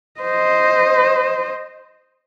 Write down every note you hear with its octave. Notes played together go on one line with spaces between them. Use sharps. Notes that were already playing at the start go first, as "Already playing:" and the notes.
C5 D#5